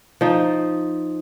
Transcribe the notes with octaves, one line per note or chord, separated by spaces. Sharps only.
F3 D#4